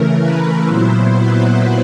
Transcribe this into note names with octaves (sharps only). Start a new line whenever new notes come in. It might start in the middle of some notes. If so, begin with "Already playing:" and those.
Already playing: C#3 E3 A3 A#4
B4
A#2 F#3 B3 E4 C5
B4